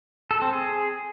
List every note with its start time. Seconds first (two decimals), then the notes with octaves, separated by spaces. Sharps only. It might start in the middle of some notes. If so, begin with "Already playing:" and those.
0.31 A4
0.42 C4
0.53 G#4